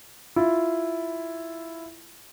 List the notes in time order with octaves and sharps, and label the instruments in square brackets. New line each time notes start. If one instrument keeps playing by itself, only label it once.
[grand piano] E4 F4